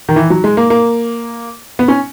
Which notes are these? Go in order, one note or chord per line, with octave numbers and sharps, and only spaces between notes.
D#3
E3
F#3
G#3
A#3
A#3
B3
C#4